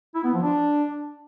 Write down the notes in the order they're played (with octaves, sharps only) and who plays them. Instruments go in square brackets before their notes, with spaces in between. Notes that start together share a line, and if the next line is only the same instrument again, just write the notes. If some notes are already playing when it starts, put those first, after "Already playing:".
[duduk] E4
B3
F3
D4